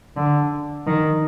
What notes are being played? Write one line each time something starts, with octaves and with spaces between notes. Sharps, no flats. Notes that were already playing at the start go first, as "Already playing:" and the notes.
D3
D#3